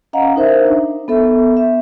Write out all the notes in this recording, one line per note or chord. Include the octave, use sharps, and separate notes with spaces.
C#4 D#5 F5 F#5 A#5
D#4 A#4 C5 E5
D4
B3 A4 E5
E5